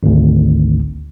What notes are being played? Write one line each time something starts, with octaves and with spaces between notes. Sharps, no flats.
G#1 D2